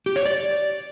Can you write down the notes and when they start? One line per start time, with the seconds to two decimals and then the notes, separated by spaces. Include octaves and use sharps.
0.06 G4
0.16 C#5
0.26 D5